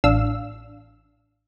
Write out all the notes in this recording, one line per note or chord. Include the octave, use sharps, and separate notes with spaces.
A1 D4 F5 E6